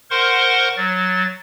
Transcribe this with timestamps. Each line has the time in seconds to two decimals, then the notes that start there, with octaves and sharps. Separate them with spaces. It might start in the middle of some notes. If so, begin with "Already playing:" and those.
0.11 A#4 C5 F#5 C6 C#6
0.76 F#3 A6